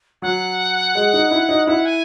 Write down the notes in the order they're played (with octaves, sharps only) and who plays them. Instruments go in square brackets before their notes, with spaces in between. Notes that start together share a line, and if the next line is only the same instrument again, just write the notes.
[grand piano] F#3 [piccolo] F#5
[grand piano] G#3
D#4
E4
D#4
[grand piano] E4 [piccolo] F#5
[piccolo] G#5